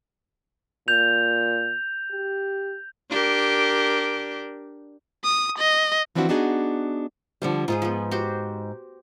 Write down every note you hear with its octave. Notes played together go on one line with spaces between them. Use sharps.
A#2 G6 F7
G4
D4 G4 A#4
D#6
D#5
E3 F3 C4 D4 E4 F#4
B3 D4 D#4 F#4 G#4
D3 F3 G3 C5
G#2 F4 G#4 C5
F3 B3
F#4 G4 C5